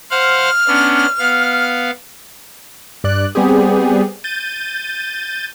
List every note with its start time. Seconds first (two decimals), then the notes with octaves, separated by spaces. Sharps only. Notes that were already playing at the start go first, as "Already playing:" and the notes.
0.11 C5 F5 F#5 F6
0.68 B3 C#4 D4
1.19 B3 F5
3.04 G2 D5 F#6
3.35 G3 B3 C4 G4 G#4
4.24 G6 A6 D#7